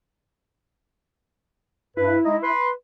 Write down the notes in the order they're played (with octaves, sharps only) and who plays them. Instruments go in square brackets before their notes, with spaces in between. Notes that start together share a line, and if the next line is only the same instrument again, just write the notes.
[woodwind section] G2 B4 [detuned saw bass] E4
[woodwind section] G#3 D#4 D#5
B4 C6